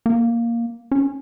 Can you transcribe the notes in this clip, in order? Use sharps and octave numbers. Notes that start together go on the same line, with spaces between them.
A#3
C#4